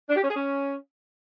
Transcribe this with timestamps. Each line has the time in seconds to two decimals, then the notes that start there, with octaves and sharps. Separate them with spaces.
0.10 D4
0.16 G4
0.23 C#4
0.30 G#4
0.36 C#4